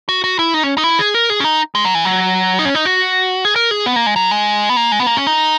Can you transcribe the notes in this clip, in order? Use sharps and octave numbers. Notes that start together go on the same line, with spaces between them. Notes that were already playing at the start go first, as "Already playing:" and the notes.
F#4
F#4
E4
D#4
C#4
D#4
E4
G#4
A#4
G#4
C#4
D#4
G#3
F#3
E3
F#3
D#4
C#4
D#4
F#4
G#4
A#4
G#4
B3
A#3
G#3
F#3
G#3
B3
A#3
G#3
B3
A#3
C#4
D#4